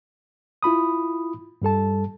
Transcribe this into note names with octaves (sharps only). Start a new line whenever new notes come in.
E4 F4 B5 D#6
G2 G3 A4 A5